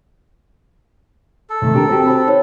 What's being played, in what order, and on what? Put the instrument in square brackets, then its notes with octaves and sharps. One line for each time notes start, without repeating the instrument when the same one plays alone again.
[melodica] A4
[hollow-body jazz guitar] C3 D#3 A3
D4 G4 A#4
C4 F#4 G4
[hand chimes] C5 A5 B5
D#4 C#5